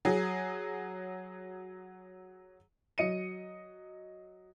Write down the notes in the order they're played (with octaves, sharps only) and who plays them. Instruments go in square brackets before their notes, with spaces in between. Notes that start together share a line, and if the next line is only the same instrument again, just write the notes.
[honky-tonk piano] F#3 G#4
[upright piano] F#3 D#5 C#7 D#7